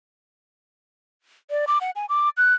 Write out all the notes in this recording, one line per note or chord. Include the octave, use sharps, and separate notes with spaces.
D5
D6
F#5
G#5
D6
F#6